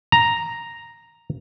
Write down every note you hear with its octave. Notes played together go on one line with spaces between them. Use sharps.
A#5